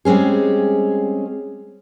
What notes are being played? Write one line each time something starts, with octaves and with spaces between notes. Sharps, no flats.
G3 G#3 C4 C#4 G#4